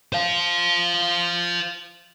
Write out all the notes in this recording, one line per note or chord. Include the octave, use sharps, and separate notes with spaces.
C5 F5